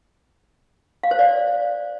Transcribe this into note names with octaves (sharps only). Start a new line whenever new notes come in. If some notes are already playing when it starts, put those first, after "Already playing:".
F5
C5
D5